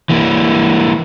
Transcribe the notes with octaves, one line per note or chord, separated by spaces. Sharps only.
E3 A#3